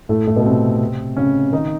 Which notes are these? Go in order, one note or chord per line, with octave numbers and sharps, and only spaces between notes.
A2 A3
A2 A3
B2 B3
C3 C4
C#3 C#4
D#3 D#4